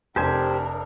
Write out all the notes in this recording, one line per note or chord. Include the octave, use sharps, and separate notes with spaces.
F1 D4 G4 A#4 C5 G#5